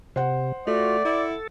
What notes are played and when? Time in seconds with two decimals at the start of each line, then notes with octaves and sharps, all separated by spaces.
0.16 C3 C5 F#5
0.67 A3 F4 F#4 D5
1.05 E4 A4